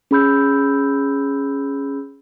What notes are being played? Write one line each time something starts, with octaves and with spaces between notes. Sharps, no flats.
C#4 G#4 B5 E6 G6